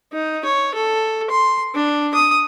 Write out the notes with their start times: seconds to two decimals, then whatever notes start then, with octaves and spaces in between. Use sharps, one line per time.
0.12 D#4
0.45 C#5
0.74 A4
1.30 C6
1.75 D4
2.14 D#6